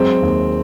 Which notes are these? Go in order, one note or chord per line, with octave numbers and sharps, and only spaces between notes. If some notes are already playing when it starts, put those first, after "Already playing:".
Already playing: F#3 G#3 C4
D#2